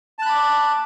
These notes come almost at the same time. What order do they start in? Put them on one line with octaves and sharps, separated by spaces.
A5 F#6 B5 D6